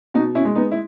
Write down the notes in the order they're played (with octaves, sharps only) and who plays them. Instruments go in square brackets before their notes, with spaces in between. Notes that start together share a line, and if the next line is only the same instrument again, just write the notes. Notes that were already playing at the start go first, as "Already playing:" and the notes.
[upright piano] B2 D#4 F#4
C#4 E4
G#3
B3 D#4
E4